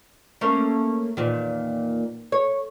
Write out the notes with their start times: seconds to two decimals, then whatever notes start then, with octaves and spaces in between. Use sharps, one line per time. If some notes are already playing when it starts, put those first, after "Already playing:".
0.41 A3 A#3 C#4
1.17 E2 A#2 D#3
2.32 C#5